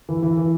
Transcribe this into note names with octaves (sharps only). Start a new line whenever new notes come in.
E3
E3
E3